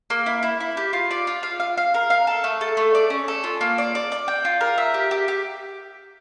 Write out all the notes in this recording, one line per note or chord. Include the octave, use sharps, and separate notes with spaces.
A#3
E4
E4
E4
G4
F4
D5
F4
F5
F5
F5
A#4
F5
A4
A3
A4
A3
D5
C#4
A4
F4
A#3
D5
D5
D5
G5
F4
A#4
E5
G4
G4
G4